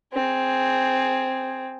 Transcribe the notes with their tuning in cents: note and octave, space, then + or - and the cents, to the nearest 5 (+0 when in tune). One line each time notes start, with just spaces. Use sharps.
C4 +0 G#4 +0